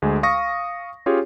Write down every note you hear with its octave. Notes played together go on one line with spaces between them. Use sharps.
D2 G#3
F5 C#6 D#6 A#6
C#4 F4 G4 G#4 C#5